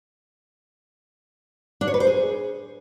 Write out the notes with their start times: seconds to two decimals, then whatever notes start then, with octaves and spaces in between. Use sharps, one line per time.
1.81 D4
1.87 C#5
1.94 B4
2.00 C5
2.07 G#4